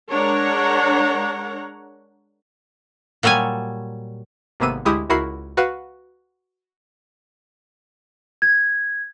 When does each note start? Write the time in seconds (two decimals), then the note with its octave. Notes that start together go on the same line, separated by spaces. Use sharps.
0.11 G#3 D4 A#4 C#5 F#5 A#5
3.23 A#2 F#3 G3 C#5 G#5
4.60 G#1 C3 A#3 B3 E6 D#7
4.85 D2 G#3 E4 G4 D#6
5.10 C#2 E4 F#4 A#4 B5 C7
5.57 F#4 B4 F5 F#5
8.42 G#6